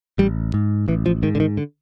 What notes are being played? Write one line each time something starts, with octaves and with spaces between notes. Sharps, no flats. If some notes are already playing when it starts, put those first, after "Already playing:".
A1 G3
G#2
A1 E3
F3
G#2 D#3
D3
D#3
D3